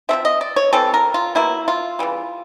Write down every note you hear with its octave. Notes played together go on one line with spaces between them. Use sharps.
F3 A3 C4 E5
D#5
D5
C#5
E3 G3 C4 A4
A#4
F4
B2 F#3 A#3 E4
F4
C#3 E3 G3